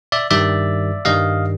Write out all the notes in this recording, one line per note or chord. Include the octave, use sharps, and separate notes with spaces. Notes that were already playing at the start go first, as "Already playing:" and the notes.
D5 E5
G2 D#3 G3 D5 E5
G2 D#3 G3 D#5 F5